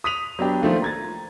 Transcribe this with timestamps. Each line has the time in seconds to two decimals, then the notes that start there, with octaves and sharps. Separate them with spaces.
0.04 D#6 B6 D#7 F7
0.39 F#3 B3 D4 G4
0.61 D#3 F3 A3 A#3
0.82 A#5 G#6 A6